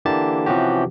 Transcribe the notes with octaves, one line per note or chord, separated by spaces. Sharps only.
D3 E3 A#3 G4 A5 A6
C3 E3 F3 C#4 F#4 G4